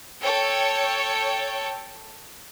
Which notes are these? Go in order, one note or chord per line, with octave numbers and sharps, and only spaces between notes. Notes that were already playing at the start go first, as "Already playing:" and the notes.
A4 C#5 G5